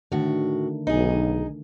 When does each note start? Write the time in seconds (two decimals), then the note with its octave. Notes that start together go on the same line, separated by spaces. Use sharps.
0.12 A2 D3 D#3 A3 F#4
0.87 B1 D#4 G#4